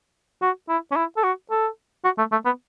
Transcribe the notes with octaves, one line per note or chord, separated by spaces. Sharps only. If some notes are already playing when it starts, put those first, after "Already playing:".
F#4
E4
C#4
E4
A4
F#4
A4
F#4
A3
A3
B3